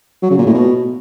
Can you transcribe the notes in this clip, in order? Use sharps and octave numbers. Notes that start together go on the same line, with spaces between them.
F#3
C#3
A#2
A2
B2